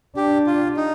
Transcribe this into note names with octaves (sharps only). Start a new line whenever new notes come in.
D4 G4
F4
D#4